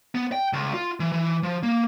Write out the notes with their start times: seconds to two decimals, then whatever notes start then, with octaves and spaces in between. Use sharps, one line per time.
0.15 B3
0.32 G5
0.53 C#2
0.74 F4
1.00 E3
1.12 E3
1.43 F3
1.63 A#3